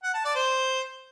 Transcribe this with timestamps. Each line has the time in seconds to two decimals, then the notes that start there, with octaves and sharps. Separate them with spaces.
0.03 F#5
0.14 A5
0.25 D5
0.35 C5